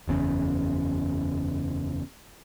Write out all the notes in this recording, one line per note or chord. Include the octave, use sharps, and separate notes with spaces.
F#1 E2 C#3